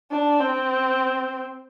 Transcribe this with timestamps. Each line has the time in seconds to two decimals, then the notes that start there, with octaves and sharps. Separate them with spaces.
0.11 D4
0.40 C4